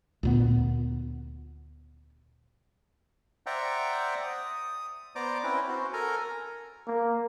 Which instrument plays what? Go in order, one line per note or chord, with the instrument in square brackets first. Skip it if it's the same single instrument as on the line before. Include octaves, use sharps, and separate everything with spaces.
[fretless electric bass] D2 A#2 B3
[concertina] C5 D5 E5 F#5 G5 A#5
D#6
B3 C5 D5 A#5 D6
C4 C#4 E4 B4
F#4 C5
A4 A#4 G#5 A#5
[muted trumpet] A#3